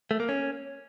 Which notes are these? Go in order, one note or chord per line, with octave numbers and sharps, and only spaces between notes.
A3
A#3
C#4